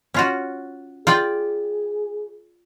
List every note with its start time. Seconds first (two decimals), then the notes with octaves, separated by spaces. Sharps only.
0.14 C#4 F4 F#4
1.07 F4 G#4 D5 G5